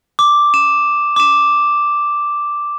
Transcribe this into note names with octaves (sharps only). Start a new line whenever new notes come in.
D6
E7
D6 E7